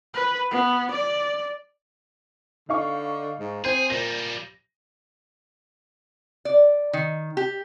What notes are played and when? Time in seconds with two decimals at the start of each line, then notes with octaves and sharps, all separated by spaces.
0.14 B4
0.51 B3
0.91 D5
2.69 D3 D#4 F5 C#6
3.39 G#2
3.65 C4 G#4 C5
3.90 A#2 F3 G3 A#6
6.45 D5
6.93 D#3
7.37 G4